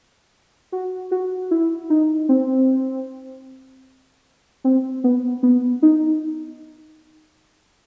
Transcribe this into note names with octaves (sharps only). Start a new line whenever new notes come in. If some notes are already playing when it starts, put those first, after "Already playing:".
F#4
F#4
E4
D#4
C4
C4
B3
B3
D#4